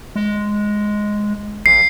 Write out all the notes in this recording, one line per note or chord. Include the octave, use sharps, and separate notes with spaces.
G#3
A1 C7